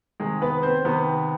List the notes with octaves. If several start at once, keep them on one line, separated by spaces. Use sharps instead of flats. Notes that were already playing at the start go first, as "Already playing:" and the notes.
C3 D#3 G#3 G#4
B3 B4
C4 C5
C3 D#3 B3 B4